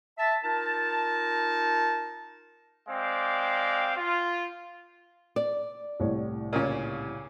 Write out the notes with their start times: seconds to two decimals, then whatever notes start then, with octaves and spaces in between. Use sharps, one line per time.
0.18 E5 A5
0.44 D#4 F4 A#4 A5
2.89 G#3 C4 D5 F5 G5
3.97 F4
5.36 D5
6.00 C2 A2 C#5
6.53 A#2 C#3 C#4